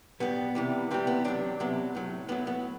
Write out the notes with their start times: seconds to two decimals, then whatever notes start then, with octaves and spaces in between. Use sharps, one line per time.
0.20 B2 G3 B3
0.55 C3 E3 G3
0.91 C3 E3 G3 C4
1.07 B3
1.24 C3 F#3 D4
1.60 C3 F#3 B3
1.95 A2 F#3
2.29 A2 F#3 B3
2.47 B3